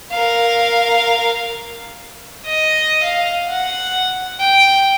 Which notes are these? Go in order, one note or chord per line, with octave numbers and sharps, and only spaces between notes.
A#4 F5
D#5
F5
F#5
G5